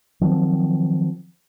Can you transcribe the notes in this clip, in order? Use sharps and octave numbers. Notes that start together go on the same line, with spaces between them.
D#3 F3 F#3 C4